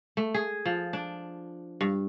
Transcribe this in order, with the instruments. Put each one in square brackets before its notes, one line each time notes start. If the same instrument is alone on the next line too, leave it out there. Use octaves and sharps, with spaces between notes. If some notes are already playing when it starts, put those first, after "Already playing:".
[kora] A3
G#4
F3
D4
G2